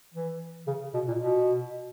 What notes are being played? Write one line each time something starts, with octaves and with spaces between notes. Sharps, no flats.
E3
C#3
B2
A#2
B2